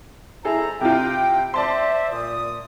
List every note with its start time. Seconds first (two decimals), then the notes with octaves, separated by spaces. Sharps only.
0.45 F2 E4 G#4 A4 C5 A#5
0.81 C3 E4 F4 G5
1.54 C5 D5 E5 A5 C6
2.12 A#2 D#6